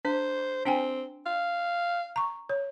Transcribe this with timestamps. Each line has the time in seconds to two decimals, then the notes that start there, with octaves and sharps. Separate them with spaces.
0.05 D4 C5
0.65 C4 D4 G5 G#5
1.26 F5
2.16 A#5 C#6
2.49 C#5